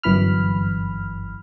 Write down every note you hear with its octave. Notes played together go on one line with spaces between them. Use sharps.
G1 F#2 E3 B5 F6